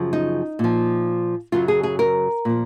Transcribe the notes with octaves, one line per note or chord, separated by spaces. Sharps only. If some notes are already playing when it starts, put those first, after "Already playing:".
Already playing: F#2 C#3 F3
D#4
A#2 F3
F#2 C#3 F#3 F4
G#4
G#4
A#4
A#2 F3